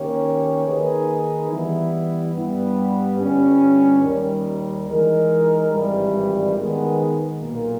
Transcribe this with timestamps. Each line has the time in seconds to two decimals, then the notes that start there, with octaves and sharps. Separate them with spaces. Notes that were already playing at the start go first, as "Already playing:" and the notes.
Already playing: D#3 A#3 C#4 G4 C#5
0.66 D#3 A#3 D#4 G#4 B4
1.50 E3 G3 B3 E4
2.34 G2 G3 B3
3.17 G1 G2 G3 C#4
4.02 D#2 D#3 G3
4.86 E3 G#3 D#4 A#4
5.70 G#1 G2 E3 G3
6.54 D#3 G#3 B3
7.38 B1 A#2 A#3